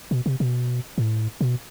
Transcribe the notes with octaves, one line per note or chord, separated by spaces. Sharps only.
B2
C3
B2
A2
B2